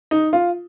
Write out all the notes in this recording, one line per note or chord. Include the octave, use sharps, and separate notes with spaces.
D#4
F4